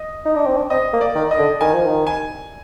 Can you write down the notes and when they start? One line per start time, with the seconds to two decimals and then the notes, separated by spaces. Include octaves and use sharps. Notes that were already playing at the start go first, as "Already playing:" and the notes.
Already playing: D#5
0.25 D#4
0.35 D4
0.46 C4
0.57 D4
0.70 C4 D#5
0.94 A#3
1.01 D5
1.15 D#3
1.31 D#5
1.39 D3
1.61 D#3 G#5
1.73 F3
1.86 D#3
2.07 G#5